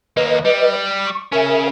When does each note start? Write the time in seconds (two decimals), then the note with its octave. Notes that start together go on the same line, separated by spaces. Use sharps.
0.17 D#2 A#3 B4 D#5
0.45 G3
1.05 C#6
1.32 C#3 C#4 A#4 E5 G#5